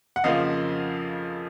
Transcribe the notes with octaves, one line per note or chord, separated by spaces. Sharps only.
F#5
F2 C#3 F3 A#3 D#5 F5